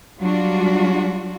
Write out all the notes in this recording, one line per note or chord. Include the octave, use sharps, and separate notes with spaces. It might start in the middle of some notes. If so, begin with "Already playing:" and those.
F#3 G3 D4 F4 F#4